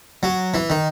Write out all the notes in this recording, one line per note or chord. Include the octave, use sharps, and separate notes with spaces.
F#3
E3
D#3